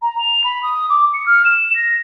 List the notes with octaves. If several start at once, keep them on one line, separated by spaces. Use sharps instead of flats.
A#5
F7
B5
D#6
D6
C#7
F6
E7
A#6